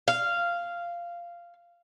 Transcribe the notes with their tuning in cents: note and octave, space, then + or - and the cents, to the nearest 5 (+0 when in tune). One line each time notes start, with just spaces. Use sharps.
F5 -10